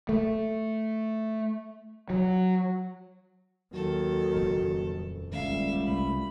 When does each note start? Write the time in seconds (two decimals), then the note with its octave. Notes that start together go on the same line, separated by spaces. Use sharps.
0.09 A3
2.10 F#3
3.73 D#2 D#3 F#3 A4
4.36 D#1 F2 C#3
5.32 D#1 G#1 C#2 G3 E5 F5
5.83 C2 A3 B5